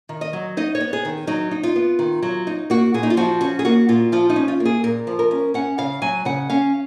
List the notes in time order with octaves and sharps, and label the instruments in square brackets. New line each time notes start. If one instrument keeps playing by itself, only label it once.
[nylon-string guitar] D#3
D#5
F#3
D#4 D#5
C#5
B3
G#4
D#3
F#3 D#4
D#4
F4
B3
D#3
F#3
D#4
A#3 F#4
A#2 G#4
D#4
F4
F3 F#4
C#4 F#4
G#4
A#3 F#4
A#2 F4
F3 F4
D#4
C#4
F4
A#3
G#4
A#2 A#4
F3
A#4
C#4
C#4 F#5
C#3 F5
F#3 G#5
C#3 F#5
C#4 F5